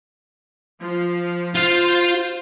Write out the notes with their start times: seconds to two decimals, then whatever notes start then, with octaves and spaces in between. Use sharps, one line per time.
0.80 F3
1.55 F4 C5 F5